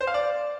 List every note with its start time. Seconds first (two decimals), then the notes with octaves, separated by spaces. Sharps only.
0.01 C5
0.07 F5
0.14 D5